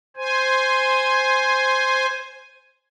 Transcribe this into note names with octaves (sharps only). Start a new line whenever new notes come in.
C5 G#5